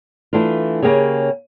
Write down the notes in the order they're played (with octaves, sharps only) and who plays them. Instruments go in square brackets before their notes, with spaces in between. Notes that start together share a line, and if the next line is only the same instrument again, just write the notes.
[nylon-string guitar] E3 A3 D4 F4
C#3 A#3 G4 G#4 C#5